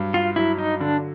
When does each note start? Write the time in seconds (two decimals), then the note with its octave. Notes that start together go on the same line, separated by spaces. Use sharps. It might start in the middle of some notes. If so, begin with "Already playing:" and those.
Already playing: G2 F#3
0.14 F4
0.36 F#3 E4
0.58 D#4
0.80 D3 D4